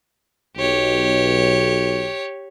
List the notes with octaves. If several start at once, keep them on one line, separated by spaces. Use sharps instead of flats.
B1 G4 C#5